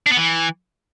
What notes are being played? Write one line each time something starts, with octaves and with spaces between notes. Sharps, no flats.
D4
B3
E3